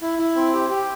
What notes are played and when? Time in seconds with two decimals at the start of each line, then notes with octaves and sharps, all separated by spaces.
0.01 E4
0.18 E4
0.36 C4
0.53 G4
0.70 G4